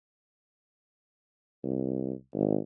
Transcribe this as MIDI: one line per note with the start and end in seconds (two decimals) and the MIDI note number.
1.64 2.12 36
2.34 2.58 32